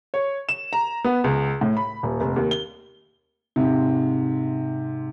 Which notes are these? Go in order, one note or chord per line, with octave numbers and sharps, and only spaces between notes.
C#5
E7
A#5
B3
C#2
A2
B5
D#1
F1
D#2
G7
G#2 C3